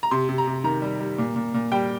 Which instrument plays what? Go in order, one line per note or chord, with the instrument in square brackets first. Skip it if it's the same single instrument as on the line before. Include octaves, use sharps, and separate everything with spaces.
[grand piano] A#5
C3 C6
C3
A#5
C3
D#3 A#5
G3
G3
A#2
A#2
A#2
G3 G5